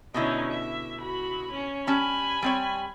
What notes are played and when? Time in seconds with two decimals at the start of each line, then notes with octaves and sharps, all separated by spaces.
0.14 B2 D3 C#4 D#4 E4
0.51 E5
1.00 F#4 B5
1.52 C#4
1.87 G3 C#4 G#5 A5 B5
2.43 G3 C4 C#5